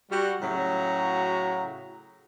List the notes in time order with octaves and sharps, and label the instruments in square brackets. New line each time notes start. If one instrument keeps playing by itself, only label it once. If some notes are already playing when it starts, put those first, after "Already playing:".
[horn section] G3 F#4
A2 C#3 F#3 C#4 F#4 A#5